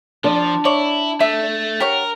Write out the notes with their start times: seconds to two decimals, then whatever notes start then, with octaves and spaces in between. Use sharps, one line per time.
0.24 F3 D4
0.65 E4 C#5 D5
1.20 A3 E5
1.80 G4 A#4 C#5 F#5